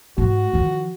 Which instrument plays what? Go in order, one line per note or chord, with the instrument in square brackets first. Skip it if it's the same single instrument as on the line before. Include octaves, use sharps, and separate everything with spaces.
[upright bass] G#2 [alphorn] F#4
[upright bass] D#3 F3